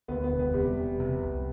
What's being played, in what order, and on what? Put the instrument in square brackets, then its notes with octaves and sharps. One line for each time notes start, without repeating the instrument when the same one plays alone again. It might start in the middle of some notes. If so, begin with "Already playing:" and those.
[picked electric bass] D2 [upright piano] B3
[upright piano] B3
[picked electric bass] E1
[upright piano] B3
[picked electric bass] C3 [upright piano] G3
[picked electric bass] E1
C3
C2